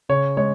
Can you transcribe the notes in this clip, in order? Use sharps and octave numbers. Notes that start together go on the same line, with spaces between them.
C#3 C#5
G#3 C#5